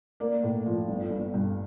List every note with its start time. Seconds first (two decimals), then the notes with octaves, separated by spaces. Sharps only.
0.20 A#3 A#4 D5
0.43 A2
0.66 F3
0.88 G1
1.10 G1
1.34 G2